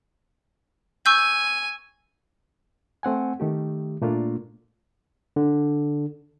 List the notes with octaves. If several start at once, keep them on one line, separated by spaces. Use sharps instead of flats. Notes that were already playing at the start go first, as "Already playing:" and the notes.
G#5 C#6 E6 G6
A3 C4 F#5 G#5
D#3 A3 G4
A#2 A3 A#3 D4 F4
D3